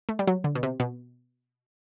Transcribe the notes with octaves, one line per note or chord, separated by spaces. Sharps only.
A3
G3
F#3
D3
B2
C3
B2